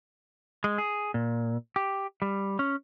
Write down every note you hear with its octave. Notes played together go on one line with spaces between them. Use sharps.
G#3
G#4
A#2
G4
G3
C#4